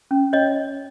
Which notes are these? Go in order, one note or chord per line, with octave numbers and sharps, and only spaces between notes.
C#4
C#4 C#5 D#5